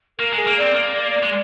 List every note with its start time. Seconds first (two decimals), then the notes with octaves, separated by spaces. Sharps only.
0.19 A#3 A#4
0.33 G#3
0.38 G#4
0.47 A#3
0.56 C4 D5
0.75 A#3
1.23 G#3